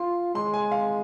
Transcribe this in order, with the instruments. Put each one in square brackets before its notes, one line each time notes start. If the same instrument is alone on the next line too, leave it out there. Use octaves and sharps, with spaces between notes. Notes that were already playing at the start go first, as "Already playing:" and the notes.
Already playing: [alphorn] F4 [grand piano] C6
[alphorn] G#3 [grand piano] C6
[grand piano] G#5
F5